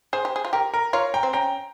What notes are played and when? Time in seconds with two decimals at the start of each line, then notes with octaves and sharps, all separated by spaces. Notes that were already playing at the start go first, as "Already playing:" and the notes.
0.13 G#4 C5
0.25 G4
0.36 G#4
0.45 F4
0.53 G4 A#4
0.74 A#4
0.93 F4 A#4 C#5
1.14 G5 A#5
1.23 C4
1.33 C#4 G5 A#5